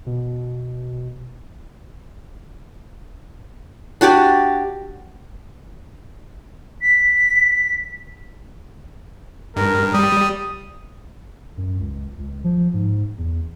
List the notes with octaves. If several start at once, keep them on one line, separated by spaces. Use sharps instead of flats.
B2
D4 F#4 G4 D5
B6
G2 A#4
G3 D#6
F#2
C#2
C#2
F3
G#2
E2